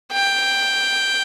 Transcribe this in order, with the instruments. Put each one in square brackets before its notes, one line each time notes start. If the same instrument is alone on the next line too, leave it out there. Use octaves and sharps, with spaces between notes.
[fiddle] G5